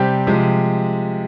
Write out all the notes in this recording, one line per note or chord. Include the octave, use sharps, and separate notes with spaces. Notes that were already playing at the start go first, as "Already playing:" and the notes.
Already playing: C3 G3 C4 G4
C3 F3 G#3